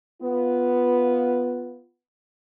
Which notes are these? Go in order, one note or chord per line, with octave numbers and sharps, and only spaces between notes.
B3 F4